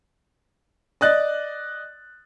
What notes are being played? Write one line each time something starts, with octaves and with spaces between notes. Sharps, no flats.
D5 D#5 F#6 A6